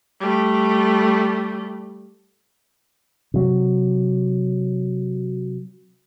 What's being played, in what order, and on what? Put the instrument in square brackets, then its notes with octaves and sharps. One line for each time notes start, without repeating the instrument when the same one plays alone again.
[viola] G3 A3
[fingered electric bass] C3 F#3